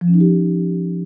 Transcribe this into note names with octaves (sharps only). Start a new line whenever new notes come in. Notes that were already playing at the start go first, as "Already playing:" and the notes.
F3
C#4
D#4
G4